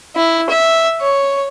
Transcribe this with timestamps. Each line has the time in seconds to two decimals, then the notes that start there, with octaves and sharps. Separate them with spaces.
0.16 E4
0.50 E5
1.02 C#5